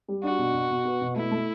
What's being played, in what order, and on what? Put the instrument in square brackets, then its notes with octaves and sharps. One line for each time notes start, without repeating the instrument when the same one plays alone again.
[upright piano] G3
[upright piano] D4 [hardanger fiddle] F#4
[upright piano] B2
B2
B2
B3
B2
[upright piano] A3 [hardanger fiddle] E4
[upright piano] A3